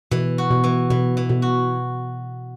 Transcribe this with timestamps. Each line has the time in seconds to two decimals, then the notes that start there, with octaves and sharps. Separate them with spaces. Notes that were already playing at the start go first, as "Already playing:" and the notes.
0.11 B2 E3
0.38 F#4
0.51 B2
0.64 E3
0.90 B2 E3
1.17 E3
1.29 B2
1.42 F#4